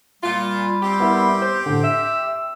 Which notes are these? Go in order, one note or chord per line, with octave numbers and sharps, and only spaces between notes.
A#2 G3 F4
C4 G4
B3 E4 A#4
C5
A2 D3
E5 E6